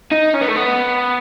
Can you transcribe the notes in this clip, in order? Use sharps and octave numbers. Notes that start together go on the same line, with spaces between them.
D#4
C#4
B3
A3
B3